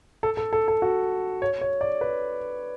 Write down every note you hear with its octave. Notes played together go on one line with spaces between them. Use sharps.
A4
A4
A4
A4
F#4
C#5
C#5
D5
B4